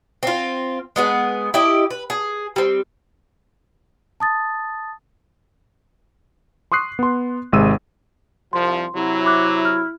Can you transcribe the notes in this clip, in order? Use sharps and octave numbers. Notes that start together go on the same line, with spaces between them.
C4 F4
G#3 B3 G#4
E4 G4 D#5
B4
G#4
G3 C4
A5 D#6 A6
C6 C#6 D#6 F#6 C7
B3 C6
G#1 C3 G#3 E6 D#7
C2 F3 C6
C3 F#3 E4
B5 D6 F#6
F6